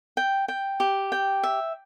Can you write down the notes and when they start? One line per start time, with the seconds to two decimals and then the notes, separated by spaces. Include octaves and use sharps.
0.17 G5
0.48 G5
0.80 G4
1.12 G5
1.43 E5